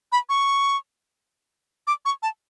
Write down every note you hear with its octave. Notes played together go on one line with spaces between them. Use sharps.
B5
C#6
D6
C#6
A5